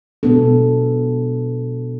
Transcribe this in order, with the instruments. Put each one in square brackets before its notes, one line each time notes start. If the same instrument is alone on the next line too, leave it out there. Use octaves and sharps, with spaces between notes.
[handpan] B2 G#3 B3 D4 A4